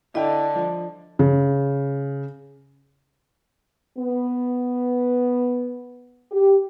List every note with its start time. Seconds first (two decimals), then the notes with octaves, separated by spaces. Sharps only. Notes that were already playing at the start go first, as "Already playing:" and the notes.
0.15 D3 E4 D#5 G5
0.55 F3
1.19 C#3
3.98 B3
6.31 G4